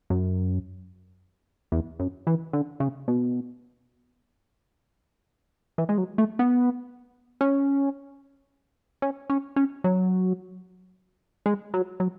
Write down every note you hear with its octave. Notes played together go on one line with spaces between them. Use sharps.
F#2
E2
F#2
E3
D3
C#3
B2
E3
G#3
F#3
A3
B3
C#4
C#4
C#4
C#4
F#3
G#3
F#3
F#3